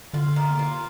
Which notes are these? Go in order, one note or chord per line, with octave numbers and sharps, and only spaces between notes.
D3 F4
A#3
F4